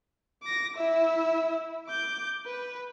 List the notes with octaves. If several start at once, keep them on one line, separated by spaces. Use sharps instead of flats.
D6 A#6
E4 E5
D6 G6
B4